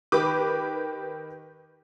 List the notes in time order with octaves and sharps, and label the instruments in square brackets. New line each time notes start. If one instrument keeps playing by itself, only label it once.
[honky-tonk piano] D#3 G4 B4 D6